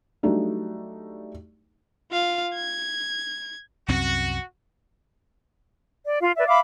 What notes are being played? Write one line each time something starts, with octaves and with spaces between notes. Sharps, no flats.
F#3 G3 A3 D4 D#4
F4 F5
G#6
C2 F#2 C4 F#4
D5
F4 F5
B4 D5 E5
E5 F5 B5 D6